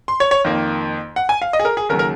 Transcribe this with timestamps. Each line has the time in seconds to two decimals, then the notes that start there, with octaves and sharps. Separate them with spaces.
0.08 C6
0.20 C#5
0.31 C#5
0.45 F2 D#3 A#3
1.16 F#5
1.29 G#5
1.42 F5
1.53 D#5
1.60 G#4
1.65 A#4
1.77 G#4
1.89 D#2 C#3 F#3 A#4
1.99 A#4